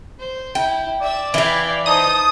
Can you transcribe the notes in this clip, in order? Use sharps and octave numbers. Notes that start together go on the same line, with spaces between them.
C5
E4 G5
D5 E5 E6
E3 E4 F5 G5
D#4 C5 A5 D#6